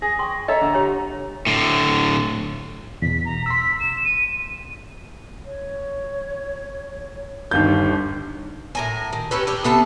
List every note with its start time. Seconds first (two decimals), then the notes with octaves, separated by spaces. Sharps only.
0.02 G#4 A#6
0.19 G5 C6 C#6
0.48 A4 C#5 D#5 E5 A#5
0.61 D3
0.74 G4 C#5 G#5
1.47 A2 D3
3.02 E2 B2 B6
3.25 A#5
3.46 C6 E6 B6
3.80 E7
4.05 D#7
5.45 C#5
7.51 G1 D#2 G6
8.75 A2 A#4 G#5
9.13 D#3
9.31 C#4 G4 A4 B4
9.47 D4 G4
9.64 C3 B3 A4 A5